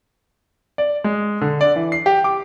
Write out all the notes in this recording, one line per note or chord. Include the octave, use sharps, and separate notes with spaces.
D5
G#3
D3
D5
E3
C7
G4
D6